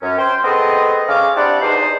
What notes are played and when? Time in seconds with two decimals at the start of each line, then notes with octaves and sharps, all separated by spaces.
0.02 F#2 C#4
0.18 C5 G5
0.44 A3 B3 C4 G#4 D#5
1.09 C#3 D6 F6
1.36 C4 D4 E4 G4 D5 F#5
1.61 E2 B2 D#4 G#4 C5